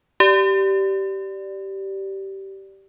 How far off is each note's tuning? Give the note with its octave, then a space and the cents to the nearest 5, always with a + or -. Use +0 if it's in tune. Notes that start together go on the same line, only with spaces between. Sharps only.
G4 -15 D5 +0